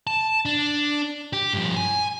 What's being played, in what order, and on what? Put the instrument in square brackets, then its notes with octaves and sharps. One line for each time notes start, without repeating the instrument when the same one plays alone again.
[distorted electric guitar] A5
D4
G4
G2 F3
G#5